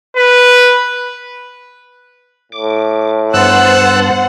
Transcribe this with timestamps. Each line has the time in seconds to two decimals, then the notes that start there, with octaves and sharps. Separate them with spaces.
0.17 B4
2.52 A2 D6
3.34 G2 B3 C5 F#5 A5 E6 F#6